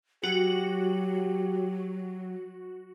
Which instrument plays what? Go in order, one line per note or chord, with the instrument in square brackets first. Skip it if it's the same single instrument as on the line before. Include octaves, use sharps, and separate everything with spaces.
[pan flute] F#3 [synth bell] F#4 [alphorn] G4